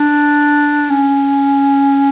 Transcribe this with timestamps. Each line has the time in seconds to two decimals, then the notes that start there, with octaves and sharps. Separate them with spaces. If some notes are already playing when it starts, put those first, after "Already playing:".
Already playing: D4
0.90 C#4